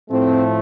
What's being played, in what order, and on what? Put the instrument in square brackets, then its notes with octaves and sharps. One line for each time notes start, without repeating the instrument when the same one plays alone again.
[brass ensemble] A2 F3 A3 C4